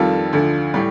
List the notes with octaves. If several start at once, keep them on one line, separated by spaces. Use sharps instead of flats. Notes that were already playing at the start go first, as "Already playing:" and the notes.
Already playing: F2 D#3 G3 F4 A4
D2 D3 F3
A2 G3